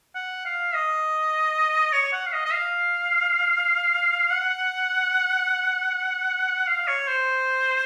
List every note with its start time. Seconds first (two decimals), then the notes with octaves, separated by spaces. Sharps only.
0.15 F#5
0.45 F5
0.75 D#5
1.93 C#5
2.13 F#5
2.26 F5
2.33 D#5
2.46 D#5
2.52 F5
4.31 F#5
6.68 F5
6.88 C#5
7.07 C5